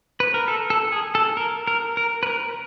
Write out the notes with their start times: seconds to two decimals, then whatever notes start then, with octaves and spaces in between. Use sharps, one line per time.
0.20 B4
0.34 A#4
0.48 A4
0.70 A4
0.92 G#4
1.15 A4
1.37 A#4
1.67 A#4
1.97 A#4
2.23 B4
2.27 A#4